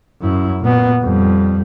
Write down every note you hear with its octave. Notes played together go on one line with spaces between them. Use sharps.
F#2 E4
A#2 B3
F2 G3